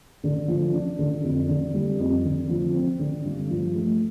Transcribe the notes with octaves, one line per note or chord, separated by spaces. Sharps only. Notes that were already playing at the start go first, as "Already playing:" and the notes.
D3
F3
D4
D3
F2
D3
G3
F2
D3
F3
C4
D3
G2
F3
A3